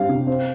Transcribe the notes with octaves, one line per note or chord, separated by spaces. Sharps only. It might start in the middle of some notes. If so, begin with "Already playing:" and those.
Already playing: G3 C4 F5
C3
C4